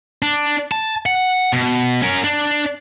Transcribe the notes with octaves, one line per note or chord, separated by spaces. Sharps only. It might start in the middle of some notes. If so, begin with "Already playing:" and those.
D4
A5
F#5
B2
C#4 A#4
D4